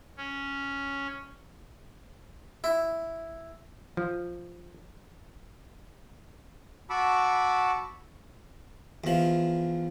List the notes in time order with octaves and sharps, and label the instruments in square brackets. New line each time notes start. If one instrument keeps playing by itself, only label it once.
[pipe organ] C#4
[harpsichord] E4
[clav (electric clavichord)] F3
[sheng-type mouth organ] F#4 A5 B5 C#6 D6 E6
[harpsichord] E2 F3